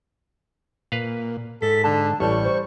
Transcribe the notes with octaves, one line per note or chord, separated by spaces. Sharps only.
A#2 B4 F5
G#2 A4 B6
D3 A5
A1 G3 C#6
C5